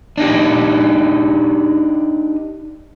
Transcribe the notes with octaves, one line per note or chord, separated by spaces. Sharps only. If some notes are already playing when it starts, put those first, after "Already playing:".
D4 D#4 G4